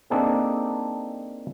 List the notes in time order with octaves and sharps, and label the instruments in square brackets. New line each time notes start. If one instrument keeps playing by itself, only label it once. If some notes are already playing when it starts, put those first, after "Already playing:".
[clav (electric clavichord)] A#3 C4 D4 D#4 G#4 A4